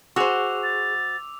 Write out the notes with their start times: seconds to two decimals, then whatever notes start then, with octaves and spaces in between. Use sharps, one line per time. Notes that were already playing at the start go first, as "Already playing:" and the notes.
0.16 F#4 G#4 C5 C#6 D6 E6 F7
0.63 A6